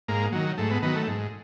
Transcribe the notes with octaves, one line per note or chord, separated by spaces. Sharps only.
G#2 A#3
D#3 F#3
G#2 A3
B3
D#3 F#3 B3
A3
G#2